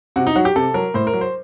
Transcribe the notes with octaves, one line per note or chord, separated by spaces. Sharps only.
C3 F#4
D#4
F#3 F#4
G4
C3 A4
F#3 A#4
A2 C5
A#4
F#3
C5